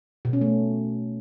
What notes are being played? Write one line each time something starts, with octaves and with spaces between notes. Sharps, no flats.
B2
C#4
A3